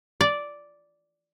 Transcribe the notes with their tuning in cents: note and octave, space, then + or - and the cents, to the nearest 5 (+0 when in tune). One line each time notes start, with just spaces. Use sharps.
D5 -5